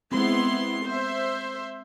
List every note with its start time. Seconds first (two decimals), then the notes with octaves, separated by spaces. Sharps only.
0.12 G#3 B3 C4 E4 C6
0.85 C5 E5